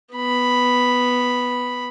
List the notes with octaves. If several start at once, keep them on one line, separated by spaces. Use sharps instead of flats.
B3 B5